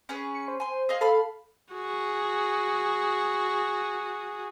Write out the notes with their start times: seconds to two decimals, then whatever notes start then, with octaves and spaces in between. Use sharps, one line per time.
0.09 C#4 G#4 B4
0.35 C#7
0.48 C5
0.60 G#5 C6
0.89 G#4 D#5 F5
1.01 A4 F5 B5 F6
1.73 F#4 G#4